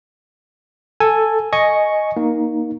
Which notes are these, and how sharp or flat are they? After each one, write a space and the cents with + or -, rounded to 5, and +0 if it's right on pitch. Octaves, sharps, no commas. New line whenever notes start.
A4 +5 G#5 +0
D#5 +0 G#5 +5 C#6 +0
A#3 +15 D#4 +0